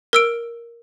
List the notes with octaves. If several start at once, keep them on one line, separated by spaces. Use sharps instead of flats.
A#4 E6 D7